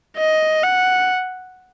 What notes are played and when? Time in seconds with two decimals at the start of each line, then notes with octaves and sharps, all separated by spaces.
0.17 D#5
0.63 F#5